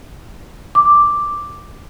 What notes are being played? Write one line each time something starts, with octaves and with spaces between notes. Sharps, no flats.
D6